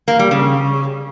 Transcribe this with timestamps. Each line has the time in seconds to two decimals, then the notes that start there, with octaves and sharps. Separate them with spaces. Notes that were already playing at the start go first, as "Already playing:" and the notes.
0.08 A#3
0.19 G3
0.31 C#3